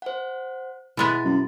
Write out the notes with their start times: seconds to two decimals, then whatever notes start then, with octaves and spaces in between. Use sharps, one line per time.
0.02 C5 F#5
0.97 B2 G#3 B3 E4 A6
1.25 F#2